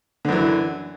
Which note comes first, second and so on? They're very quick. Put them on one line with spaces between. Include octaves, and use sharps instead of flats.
D3 F#2 E3